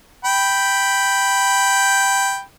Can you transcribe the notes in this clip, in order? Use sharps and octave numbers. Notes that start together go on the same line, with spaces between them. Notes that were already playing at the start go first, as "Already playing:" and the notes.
G5 B5